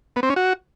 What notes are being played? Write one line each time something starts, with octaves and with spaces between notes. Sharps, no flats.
B3
C4
C#4
F#4